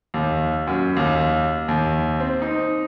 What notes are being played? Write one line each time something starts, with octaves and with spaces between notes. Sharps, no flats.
D#2
F#2
D#2
D#2
C4
D#4